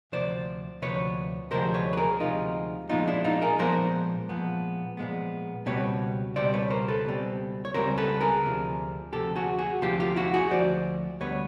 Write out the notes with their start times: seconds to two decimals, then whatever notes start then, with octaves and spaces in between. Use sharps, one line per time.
0.12 D2 C3 F3 C5 D5
0.82 D2 C3 F3 B4 C#5
1.51 D2 C3 F3 G#3 A#4 C5
1.74 B4 C#5
1.93 B4
1.97 G#4 A#4
2.20 D2 C3 F3 G#3 D#4 F4
2.89 A#2 F3 G#3 B3 D#4 F4
3.07 D4 E4
3.24 D#4 F4
3.42 G#4 A#4
3.59 A#2 F3 G#3 B3 A#4 C5
4.29 A#2 F3 G#3 B3
4.97 A#2 F3 G#3 B3
5.66 C#2 B2 G3 C4 B4 C#5
6.36 C#2 B2 G3 C4 C5 D5
6.54 B4 C#5
6.70 A#4 C5
6.88 A4 B4
7.05 C#2 B2 G3 C4
7.65 C#5
7.74 C#2 B2 G3 C4 A#4 C5
7.98 A4 B4
8.21 G#4 A#4
8.44 D2 C3 F3
9.13 D2 C3 F3 G4 A4
9.36 F#4 G#4
9.59 F#4 G#4
9.82 D2 C3 F3 F4 G4
10.00 F4 G4
10.16 E4 F#4
10.34 F#4 G#4
10.51 D2 C3 F3 C5 D5
11.20 D2 D3 G3 B3 B4 C#5